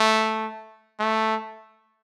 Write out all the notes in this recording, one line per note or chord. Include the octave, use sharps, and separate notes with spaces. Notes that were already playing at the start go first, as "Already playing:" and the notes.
Already playing: A3
A3